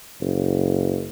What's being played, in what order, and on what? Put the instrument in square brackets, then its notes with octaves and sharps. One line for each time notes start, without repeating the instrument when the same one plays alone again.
[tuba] F#1